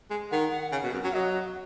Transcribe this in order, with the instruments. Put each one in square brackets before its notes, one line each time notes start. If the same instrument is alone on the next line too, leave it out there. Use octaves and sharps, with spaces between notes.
[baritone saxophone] G#3
[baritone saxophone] D#3 [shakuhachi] F#5
[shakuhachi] F#5
[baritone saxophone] C#3
B2
F#2
[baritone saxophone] F#3 [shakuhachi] F#5
[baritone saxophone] F#3 [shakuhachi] D#5